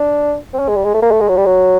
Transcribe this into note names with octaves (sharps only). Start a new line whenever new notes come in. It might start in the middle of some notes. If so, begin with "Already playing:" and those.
Already playing: D4
C4
C#4
G#3
G3
G#3
A3
A#3
A3
G#3
F#3
G3
F#3